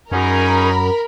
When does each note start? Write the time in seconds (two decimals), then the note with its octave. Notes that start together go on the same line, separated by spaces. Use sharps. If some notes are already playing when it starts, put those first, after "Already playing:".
0.12 F#2 C#4 D#4 G#4 A#4 B5